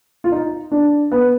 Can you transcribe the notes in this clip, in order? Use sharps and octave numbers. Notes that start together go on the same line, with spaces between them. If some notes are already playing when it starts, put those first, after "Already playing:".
F4
D#4
D4
B3